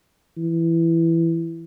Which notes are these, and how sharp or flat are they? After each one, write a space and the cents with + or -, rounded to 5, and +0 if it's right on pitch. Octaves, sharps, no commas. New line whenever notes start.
E3 +10